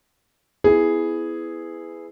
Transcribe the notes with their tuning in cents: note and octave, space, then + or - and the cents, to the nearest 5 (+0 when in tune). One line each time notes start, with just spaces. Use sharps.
B3 +25 E4 +0 G#4 +0